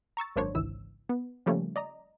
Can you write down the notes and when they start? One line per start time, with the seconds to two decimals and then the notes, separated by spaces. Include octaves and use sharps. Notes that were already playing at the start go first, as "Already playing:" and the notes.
0.17 A#5 C#6 E6 A6
0.36 G#1 F#2 A#3 D4 C5 C#5
0.55 G#1 C#2 E3 E6
1.09 B3
1.46 C#3 F3 G3 A3 A#3 C#4
1.76 D5 D#5 A#5